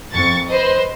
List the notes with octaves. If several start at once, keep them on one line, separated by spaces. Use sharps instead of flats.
F2 C#6 A6
B4 C5 D#5